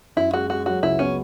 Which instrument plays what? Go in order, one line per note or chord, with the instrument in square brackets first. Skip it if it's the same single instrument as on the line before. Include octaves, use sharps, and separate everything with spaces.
[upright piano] F#2 [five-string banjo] E4
[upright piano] G#3 [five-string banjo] F#4
[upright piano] G#3 [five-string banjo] F#4
[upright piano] F#3 [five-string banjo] F#4
[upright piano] C#2 [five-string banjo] E4
[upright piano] B3 [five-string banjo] C#4